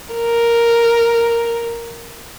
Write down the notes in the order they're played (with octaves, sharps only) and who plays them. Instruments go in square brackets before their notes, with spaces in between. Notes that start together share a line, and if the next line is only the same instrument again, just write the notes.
[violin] A#4